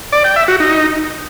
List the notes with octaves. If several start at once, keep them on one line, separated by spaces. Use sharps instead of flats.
D5
G5
E5
F#4
D#4